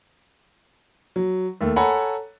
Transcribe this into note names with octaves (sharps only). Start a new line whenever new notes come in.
F#3
D#2 A3
A4 C#5 F#5 G#5 A#5 B5